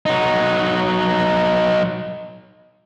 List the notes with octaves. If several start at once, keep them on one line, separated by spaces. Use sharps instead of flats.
F#3 D#4